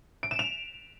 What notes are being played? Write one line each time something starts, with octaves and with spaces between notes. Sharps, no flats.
D7
E7
F7